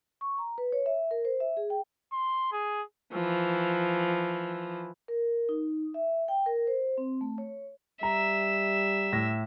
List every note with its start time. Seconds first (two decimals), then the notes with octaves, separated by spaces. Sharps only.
0.21 C#6
0.38 A#5
0.58 B4
0.72 C#5
0.86 E5
1.11 A#4
1.25 C5
1.40 E5
1.57 G#4
1.70 G5
2.13 C6
2.52 G#4
3.13 E3 F3
5.08 A#4
5.49 D#4
5.94 E5
6.28 G5
6.46 A#4
6.67 C5
6.98 C4
7.21 A3
7.38 C#5
8.03 G3 E5 A#5
9.12 A2 A#6